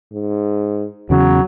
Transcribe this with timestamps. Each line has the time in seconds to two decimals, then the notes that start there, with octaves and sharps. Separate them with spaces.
0.13 G#2
1.10 E2 C#3 F#3